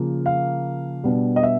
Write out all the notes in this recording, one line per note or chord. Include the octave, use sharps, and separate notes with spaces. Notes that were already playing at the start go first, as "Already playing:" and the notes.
Already playing: C#3 F3 A#3
F5
B2 G3 B3 D4
D#5
E5